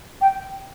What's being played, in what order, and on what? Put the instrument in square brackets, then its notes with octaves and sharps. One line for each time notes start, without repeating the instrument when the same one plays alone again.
[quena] G5